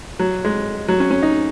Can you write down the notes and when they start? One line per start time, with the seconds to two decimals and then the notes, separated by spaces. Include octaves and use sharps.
0.19 F#3
0.45 G#3
0.88 F#3
1.00 C#4
1.11 C#4
1.22 D#4